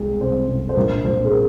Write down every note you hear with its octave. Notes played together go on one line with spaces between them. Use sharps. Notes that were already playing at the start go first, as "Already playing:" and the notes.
Already playing: C2 G#3
C2 C5
C2
C5
A#1 A#4
A#1 C5
G#4
A#4